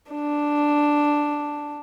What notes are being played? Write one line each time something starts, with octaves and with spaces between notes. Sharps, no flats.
D4